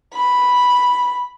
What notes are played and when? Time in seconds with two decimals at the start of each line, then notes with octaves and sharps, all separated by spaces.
0.13 B5